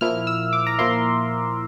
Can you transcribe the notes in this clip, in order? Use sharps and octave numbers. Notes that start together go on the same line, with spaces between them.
A#2 F3 A#3 E4 F6
E6
D6
A#5
A#2 F3 A#3 E4 C6